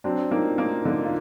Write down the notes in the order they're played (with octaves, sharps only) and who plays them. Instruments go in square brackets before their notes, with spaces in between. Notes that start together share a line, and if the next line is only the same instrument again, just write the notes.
[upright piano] F#3 [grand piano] C4 D4
[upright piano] A#3 [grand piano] D#4 F4
[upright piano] A#3 [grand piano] D#4 F4
[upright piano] D3 [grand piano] D#4 F4
[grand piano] F4